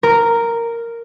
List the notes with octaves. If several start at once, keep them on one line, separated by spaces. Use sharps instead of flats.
A#4